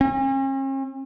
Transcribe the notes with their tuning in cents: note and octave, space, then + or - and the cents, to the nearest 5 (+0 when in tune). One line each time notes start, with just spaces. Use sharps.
C#4 -45